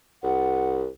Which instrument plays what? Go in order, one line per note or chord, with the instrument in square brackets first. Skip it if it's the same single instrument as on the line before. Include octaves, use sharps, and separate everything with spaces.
[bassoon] C2 [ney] F#5